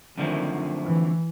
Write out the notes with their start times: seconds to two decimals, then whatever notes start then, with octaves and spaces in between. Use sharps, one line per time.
0.18 F#2 D3 D#3 F3 A3 C4
0.84 E3